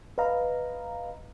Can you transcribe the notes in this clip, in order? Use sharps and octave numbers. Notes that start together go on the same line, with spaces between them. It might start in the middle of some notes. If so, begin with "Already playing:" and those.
B4 D#5 F5 A#5